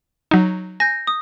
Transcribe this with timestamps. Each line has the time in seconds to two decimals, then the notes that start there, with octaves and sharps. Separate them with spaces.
0.31 F#3 D#4
0.80 G#5 G6 A#6
1.07 D#6